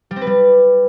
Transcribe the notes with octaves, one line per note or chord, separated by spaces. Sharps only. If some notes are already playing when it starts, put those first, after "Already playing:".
G3
C4
B4
G3